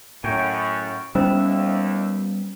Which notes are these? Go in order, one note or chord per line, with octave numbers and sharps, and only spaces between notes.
F#2 A2 C#5 G5 G#5
D#2 G3 A#3 B3 C#4 C5 E5